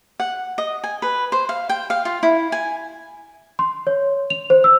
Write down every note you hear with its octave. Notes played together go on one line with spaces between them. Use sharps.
F#5
D#5
G#5
B4
C5
F5
G5
F5
F4
E4
G#5
C6
C#5
F7
C5
E6